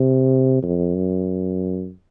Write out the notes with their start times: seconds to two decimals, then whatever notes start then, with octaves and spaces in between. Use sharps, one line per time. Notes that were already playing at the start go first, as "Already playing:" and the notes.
Already playing: C3
0.63 F2
0.95 F#2